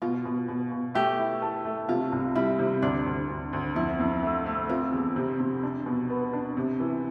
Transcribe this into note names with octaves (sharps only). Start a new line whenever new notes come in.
B2 F4
B2
B2
B2
A3 G4
E4
A4
A3
C3 F4
C2
G3 E4
C3
D2 D4
D2
D2
D2
F2 E4
F2
A3
A3
C4 F4
E2
C3
C3
D4
B2
B3
D4
C3
E3